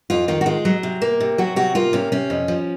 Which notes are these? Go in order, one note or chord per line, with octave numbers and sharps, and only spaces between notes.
F2 F4
D#3 F4
F#4
G#3 F4
F#3
C3
A#3
C3
F#3 F#4
C3 F#4
A#3 F4
C3 C#4
C3 C#4
F2
F3